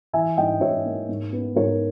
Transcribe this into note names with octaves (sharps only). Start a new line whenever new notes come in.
E3 E5 G#5
G#2 D#5 G5
G#2 C#5 E5
A#3
G#2
B3
G#2 A#4 C#5